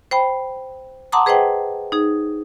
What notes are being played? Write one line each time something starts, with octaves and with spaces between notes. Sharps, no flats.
C5 G5 B5
F#5 A5 A#5 C6 D6 D#6
G#4 B4 C5 D#5 F#5 G5
D#4 G#4